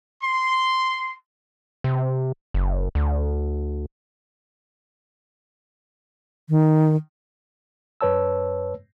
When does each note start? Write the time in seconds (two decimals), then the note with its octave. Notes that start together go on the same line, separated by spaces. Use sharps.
0.22 C6
1.84 C3
2.54 F#1
2.95 D2
6.50 D#3
8.01 F#2 B4 C#5 A5 E6